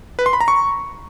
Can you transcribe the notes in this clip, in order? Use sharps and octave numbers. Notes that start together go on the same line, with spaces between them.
B4
C6
B5
A#5
C#6